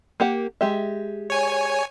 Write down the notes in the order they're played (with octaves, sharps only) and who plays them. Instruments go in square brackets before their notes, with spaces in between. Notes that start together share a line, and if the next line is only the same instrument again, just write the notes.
[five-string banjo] A#3 G4 F#5
G#3 G4 E5
[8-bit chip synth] C#5 G#5